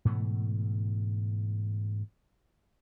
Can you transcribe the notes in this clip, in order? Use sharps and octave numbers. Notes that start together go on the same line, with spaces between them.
G#2 B2 E3 A3